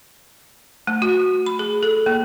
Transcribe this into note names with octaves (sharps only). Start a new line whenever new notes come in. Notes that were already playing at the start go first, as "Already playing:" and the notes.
A3
F#4
B5
G#4
A4
A#3